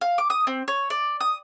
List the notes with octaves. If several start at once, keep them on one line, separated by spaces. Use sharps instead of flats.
F5
D6
D#6
C4
C#5
D5
D#6